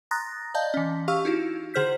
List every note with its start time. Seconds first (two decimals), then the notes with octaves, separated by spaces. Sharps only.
0.11 A#5 C6 D#6 F#6 A6 A#6
0.54 D5 D#5 F5 A5 G6
0.74 E3 C#4
1.08 G4 F5 C#6 E6 F6
1.25 D#4 E4 F#4
1.74 D3 G#4 C5 F6 G6 B6